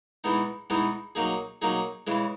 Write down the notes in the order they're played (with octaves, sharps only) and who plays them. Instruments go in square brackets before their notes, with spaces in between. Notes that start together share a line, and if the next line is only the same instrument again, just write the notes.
[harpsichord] E3 G#3 B3 D#4
E3 G#3 B3 D#4
F#3 A#3 D#4 G#4
F#3 A#3 D#4 G#4
C#3 E3 G#3